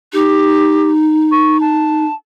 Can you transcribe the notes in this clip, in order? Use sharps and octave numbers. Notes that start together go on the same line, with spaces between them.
D#4 G4
C#6
A5